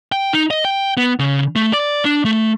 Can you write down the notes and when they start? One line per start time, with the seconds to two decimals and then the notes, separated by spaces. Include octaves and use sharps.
0.12 G5
0.33 D#4
0.51 D#5
0.65 G5
0.97 B3
1.19 C#3
1.56 A3
1.73 D5
2.05 D4
2.25 A3